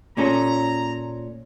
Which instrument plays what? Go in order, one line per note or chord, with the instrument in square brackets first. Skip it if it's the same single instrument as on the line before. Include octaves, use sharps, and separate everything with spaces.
[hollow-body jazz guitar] A#2 C#4 A4 [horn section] A#5